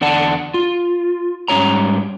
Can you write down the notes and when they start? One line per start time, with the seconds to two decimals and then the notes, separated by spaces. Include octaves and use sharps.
0.01 E2 D3 D5 F#5 A5
0.54 F4
1.48 G#2 G3 C#4 D#4 C#5 A#5